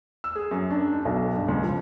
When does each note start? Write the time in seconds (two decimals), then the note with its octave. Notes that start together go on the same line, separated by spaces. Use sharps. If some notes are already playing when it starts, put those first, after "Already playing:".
0.24 E6
0.35 G#4
0.51 F#2
0.70 D4
0.92 D#4
1.05 B1
1.34 G2
1.48 C#2
1.64 F3